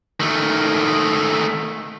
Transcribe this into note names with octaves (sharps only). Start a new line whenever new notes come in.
D#3 A3